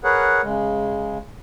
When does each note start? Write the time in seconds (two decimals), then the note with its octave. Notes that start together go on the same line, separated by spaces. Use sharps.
0.04 G#4 A#4 B4 C#5 F#5
0.43 C#3 G#3